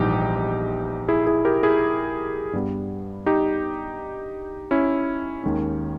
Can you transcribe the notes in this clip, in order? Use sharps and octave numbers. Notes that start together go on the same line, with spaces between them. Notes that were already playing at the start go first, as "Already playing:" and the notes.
Already playing: A#1 G#2 E3 G3 B3 D#4 G4
E4 G#4
E4 G#4
G4 A#4
E4 G#4
G2 G3 B3
D#4 G4
C#4 E4
D#2 D#3 G#3 C#4